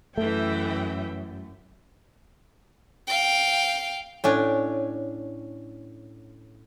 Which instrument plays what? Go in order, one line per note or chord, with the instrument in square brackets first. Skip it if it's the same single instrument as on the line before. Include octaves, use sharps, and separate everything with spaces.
[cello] F#2 [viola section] E3 E5 G5 [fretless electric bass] A3
[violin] F5 G5
[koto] A2 C#4 D4